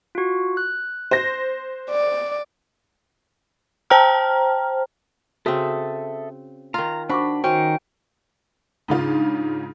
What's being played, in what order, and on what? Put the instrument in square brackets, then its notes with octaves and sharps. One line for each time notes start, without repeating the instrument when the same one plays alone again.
[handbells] F4 F#4
F#6
[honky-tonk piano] C5 A#6
[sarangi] D5
[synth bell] C5 G5 A5 A#5 F6
[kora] C#3 C4 [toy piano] F#4 [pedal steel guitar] A4 E5 D#6
[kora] D#3 F4 [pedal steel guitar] A#5
[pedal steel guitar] D4 B5 [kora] F#4 [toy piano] C5 C#6 D6
[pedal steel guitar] D#3 D#4 [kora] C#4 [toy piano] F#4 C5 [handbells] G5
[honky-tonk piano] G#2 C#3 F4 [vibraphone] D4 D#4